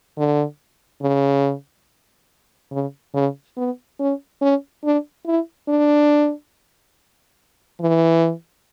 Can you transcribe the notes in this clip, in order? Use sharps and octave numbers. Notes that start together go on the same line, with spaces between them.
D3
C#3
C#3
C#3
B3
C#4
C#4
D4
E4
D4
E3